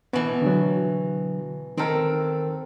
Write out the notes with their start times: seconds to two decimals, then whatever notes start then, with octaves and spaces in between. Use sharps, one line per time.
0.13 B2 E3 B3
0.42 D3 F#3
1.77 D#3 C4 A4 A#4